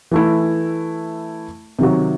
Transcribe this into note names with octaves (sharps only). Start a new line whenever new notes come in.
E3 A3 E4
C3 D#3 F#3